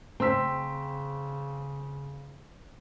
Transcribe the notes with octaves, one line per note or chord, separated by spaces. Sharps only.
C#3 C4 G5 A#5 C6 E6 B6